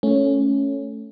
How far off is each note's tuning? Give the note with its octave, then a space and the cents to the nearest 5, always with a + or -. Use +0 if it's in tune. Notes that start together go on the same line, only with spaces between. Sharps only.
A3 +0 C#4 +0